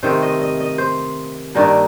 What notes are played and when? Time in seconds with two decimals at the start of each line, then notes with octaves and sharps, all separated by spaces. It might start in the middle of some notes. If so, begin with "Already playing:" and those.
0.03 C3 D#3 A3 C5
0.22 D#5
0.41 D#5
0.60 D#5
0.78 C5
1.55 G2 D#3 A#3 D4 A#4